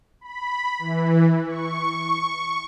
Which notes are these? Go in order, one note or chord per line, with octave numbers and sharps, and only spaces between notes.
B5
E3
C#6